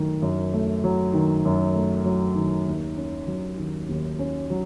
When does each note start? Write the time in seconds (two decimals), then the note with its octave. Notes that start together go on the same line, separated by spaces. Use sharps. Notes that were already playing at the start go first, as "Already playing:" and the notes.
Already playing: F#2 D#3 F#3 A3
0.22 F#2
0.53 A3
0.84 F#3
1.14 D#3
1.45 F#2
1.75 A3
2.05 F#3
2.35 D#3
2.67 D#2
2.97 C#4
3.27 F#3
3.58 D#3
3.89 D#2
4.19 C#4
4.50 F#3